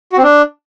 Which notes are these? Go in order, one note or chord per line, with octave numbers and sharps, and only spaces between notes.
F#4
C4
D4